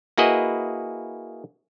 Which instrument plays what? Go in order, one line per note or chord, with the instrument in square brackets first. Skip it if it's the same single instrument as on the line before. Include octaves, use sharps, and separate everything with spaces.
[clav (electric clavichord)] A#3 E4 F#4 G#4 B4 D#5